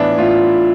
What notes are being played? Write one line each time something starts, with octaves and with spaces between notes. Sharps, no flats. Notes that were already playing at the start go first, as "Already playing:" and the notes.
Already playing: A2 E3 B3 D4 E4
A2 F4